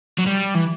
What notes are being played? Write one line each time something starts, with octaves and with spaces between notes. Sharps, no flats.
F#3
G3
E3